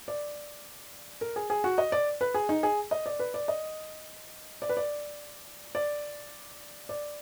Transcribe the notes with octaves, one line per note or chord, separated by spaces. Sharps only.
D5
A#4
G#4
G#4
F#4
D#5
D5
B4
G#4
D#4
G#4
D#5
D5
B4
D5
D#5
D5
B4
D5
D5
D5